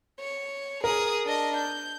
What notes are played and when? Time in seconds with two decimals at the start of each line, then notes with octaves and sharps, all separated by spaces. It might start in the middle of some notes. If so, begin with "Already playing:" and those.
0.20 C#5
0.84 G#4 A#4 D#6
1.25 D4 D#5
1.57 G6